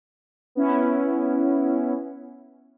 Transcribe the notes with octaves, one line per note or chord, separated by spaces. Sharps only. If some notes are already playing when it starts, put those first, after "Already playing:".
B3 C#4 E4